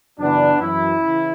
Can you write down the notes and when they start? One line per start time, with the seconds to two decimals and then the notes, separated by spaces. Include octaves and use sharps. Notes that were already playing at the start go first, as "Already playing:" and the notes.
0.19 F#2 C#3 E3 B3 D4
0.61 F#2 E3 C#4 E4
1.03 C#3 E3